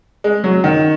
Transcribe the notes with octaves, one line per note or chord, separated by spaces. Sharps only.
G#3
F#3
D#3